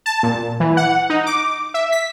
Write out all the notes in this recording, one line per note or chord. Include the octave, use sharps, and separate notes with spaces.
A5
A#2
E3
F#5
D#4
D6
E5
B6